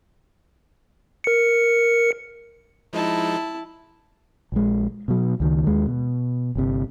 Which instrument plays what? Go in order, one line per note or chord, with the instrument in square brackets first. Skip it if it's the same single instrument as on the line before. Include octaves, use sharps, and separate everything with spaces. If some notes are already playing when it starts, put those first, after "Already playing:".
[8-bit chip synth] A#4 C#7
[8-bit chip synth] F3 G#3 D#4 [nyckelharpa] E4 A5
[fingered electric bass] A#1 G#3
B2 F#3
C#2 D#3
D#2 G#3
B2
G1 C3